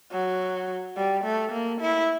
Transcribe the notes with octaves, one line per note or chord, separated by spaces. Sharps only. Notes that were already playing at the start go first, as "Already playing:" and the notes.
F#3
G3
A3
A#3
E4